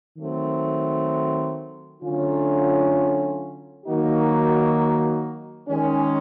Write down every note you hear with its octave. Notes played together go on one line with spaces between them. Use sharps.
D#3 F#3 A3 C4
D3 F#3 A3 C#4 F4
D#3 F#3 A#3 D#4 F#4
D#3 G#3 C#4